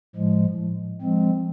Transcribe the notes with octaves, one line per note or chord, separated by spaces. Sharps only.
A2 F3 G#3
F3 G#3 C4